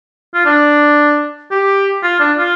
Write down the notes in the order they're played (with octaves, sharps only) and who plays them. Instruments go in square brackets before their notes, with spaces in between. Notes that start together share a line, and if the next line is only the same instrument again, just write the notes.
[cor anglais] F4
D4
G4
F4
D4
F4